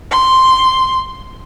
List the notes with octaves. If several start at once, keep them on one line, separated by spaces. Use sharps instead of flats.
C6